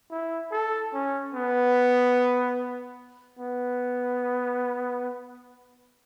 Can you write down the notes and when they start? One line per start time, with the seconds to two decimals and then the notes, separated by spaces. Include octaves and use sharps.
0.11 E4
0.52 A4
0.94 C#4
1.35 B3
3.39 B3